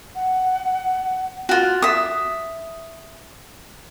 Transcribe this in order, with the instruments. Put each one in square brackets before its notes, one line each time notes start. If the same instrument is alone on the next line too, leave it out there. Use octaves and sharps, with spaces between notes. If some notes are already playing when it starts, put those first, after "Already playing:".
[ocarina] F#5
[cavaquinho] F4 F#4
E5 D#6